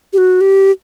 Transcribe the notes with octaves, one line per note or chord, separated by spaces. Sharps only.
G4
F#4
G4